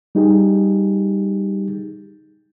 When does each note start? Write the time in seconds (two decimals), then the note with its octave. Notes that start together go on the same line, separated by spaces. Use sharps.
0.15 G3 D#4 G4 G#4